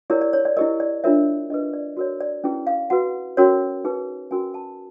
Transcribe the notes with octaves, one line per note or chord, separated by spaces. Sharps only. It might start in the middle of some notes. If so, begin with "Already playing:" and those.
E4 G4 A#4 C#5 D5
D5
C#5
D5
E4 G4 A#4 D#5
D5
D4 F4 A#4 C#5 E5
D4 G4 B4 D#5
D5
F#4 A#4 C#5 D5
D5
C#4 E4 G#4 B4
F5
F#4 B4 F#5
C#4 F#4 A#4 C#5
D#4 G#4 B4
C#4 F#4 A#4 G#5
A5